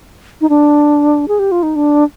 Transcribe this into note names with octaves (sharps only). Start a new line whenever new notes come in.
D#4
D4
G#4
G4
F4
D#4
D4